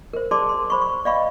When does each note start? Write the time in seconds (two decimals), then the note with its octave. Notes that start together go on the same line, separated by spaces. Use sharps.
0.13 A#4 C5
0.31 G#4 D5 A5 C6 D6
0.49 C6
0.70 C5 B5 C#6
0.82 C#6
1.05 D5 D#5 F5 G5 B5 C#6